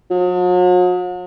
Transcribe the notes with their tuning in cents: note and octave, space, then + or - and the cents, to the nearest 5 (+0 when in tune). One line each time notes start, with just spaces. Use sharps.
F#3 -45